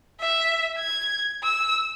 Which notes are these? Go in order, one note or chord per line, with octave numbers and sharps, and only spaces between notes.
E5
G#6
E6